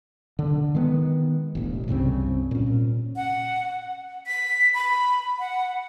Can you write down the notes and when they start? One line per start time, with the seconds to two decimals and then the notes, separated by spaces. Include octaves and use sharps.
0.39 D3
0.75 D#3 G#3 B3
1.55 E1 A1
1.88 C2 G2 C#3 C4
2.51 A#2 C#4
3.16 F#5
4.27 B6
4.74 B5
5.39 F#5